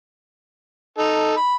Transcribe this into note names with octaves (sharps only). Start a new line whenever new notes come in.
D#4 A4
B5